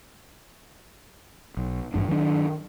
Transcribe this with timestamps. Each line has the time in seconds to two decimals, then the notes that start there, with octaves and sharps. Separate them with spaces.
1.57 B1
1.94 A1 G2 D4
2.08 D#3 F#3 G#3 D4